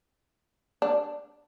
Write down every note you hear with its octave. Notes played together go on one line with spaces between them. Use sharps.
D4